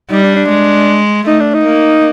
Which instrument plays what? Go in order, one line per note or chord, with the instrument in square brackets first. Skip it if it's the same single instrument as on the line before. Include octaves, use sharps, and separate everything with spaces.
[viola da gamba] G3 [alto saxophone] D#4
[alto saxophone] D4
D4
[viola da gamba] G#3
[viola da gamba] A3 [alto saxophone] D#4
[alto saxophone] D4
D#4
[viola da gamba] A#3